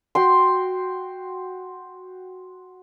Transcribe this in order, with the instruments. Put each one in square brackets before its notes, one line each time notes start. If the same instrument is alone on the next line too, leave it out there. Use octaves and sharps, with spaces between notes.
[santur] F#4 G5 C6